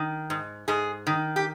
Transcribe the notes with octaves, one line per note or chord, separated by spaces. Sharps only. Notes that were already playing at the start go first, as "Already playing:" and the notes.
Already playing: D#3
G#2
G#2 G#4
D#3
G4